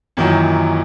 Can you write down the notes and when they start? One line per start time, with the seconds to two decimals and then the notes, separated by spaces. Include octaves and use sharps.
0.17 F#2 A#2 D#3 E3 F#3